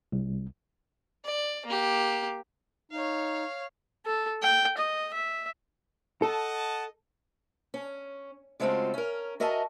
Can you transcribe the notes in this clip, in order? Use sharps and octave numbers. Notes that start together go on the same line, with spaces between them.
C2
D5
A#3 G4
D#4 C#5 F5
A4
G5
D#5
E5
A4 D#5 F#5 A5
C#4
C#3 G#3 A3 C4 F4 F#4
C#4 A#4
F#4 A#4 D#5 E5 G#5 A5